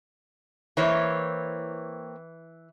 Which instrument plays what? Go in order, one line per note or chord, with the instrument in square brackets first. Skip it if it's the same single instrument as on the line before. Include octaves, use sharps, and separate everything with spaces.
[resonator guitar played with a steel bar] E3 [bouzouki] A#3 C4 C#5